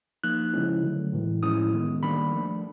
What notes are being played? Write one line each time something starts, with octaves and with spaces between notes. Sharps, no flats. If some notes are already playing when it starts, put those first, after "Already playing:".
F3 A#3 D#4 F#6
C#3 F3 G#3 C#4 E4
D3 F#3 A3
A2 E3 G#3
A2 F3 G#3 C#4 E4 D#6
D#3 G#3 B3
D#3 G3 A#3 D4 B5
F3 A3 D4